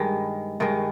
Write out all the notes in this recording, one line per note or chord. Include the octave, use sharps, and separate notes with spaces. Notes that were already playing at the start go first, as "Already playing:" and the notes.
Already playing: G2 D#3 G#3
G2 D#3 G#3